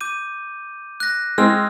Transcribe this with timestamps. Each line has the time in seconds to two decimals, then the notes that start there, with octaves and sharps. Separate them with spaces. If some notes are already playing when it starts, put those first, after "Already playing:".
0.01 D6 G6 D#7
1.00 F#6 A#6
1.38 G#3 C4 E6 F6